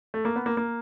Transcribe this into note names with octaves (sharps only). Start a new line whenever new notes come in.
A3
A#3
B3
A#3
A#3